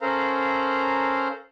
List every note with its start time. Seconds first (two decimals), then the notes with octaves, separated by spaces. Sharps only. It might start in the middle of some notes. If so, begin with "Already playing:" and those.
0.01 C#4 A4 A#4 C5 F5 A#5